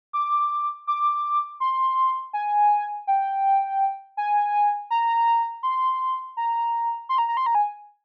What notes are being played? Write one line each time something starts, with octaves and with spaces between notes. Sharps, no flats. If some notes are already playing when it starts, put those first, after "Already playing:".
D6
D6
C6
G#5
G5
G#5
A#5
C6
A#5
C6
A#5
A#5
C6
A#5
G#5